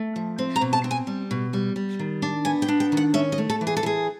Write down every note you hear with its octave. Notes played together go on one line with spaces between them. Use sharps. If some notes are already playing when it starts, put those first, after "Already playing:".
Already playing: A3
F3
C4
A#5
B2
A5
C4
G#5
G3
B2
G3
G3
D#3
D4
B3 G#5
G5
D4
G5
D#3
F#5
C#4 E5
D#5
A3
A4
E3
G#4
A4
E3 G#4